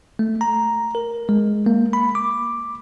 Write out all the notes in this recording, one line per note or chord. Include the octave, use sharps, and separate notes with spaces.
A3
A#5
A#4
G#3
A#3
B5
D6